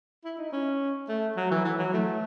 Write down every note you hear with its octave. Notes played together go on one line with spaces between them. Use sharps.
E4
D#4
C#4
A3
F#3
E3
E3
F#3
A3